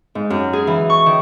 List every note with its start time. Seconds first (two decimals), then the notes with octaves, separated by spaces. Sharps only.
0.15 G#2
0.30 F#2
0.53 G#4
0.67 E3
0.90 C#6
1.06 D#3